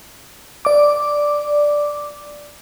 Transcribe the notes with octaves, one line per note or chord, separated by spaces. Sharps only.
D5 D6